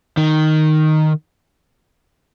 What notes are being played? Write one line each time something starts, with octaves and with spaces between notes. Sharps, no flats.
D#3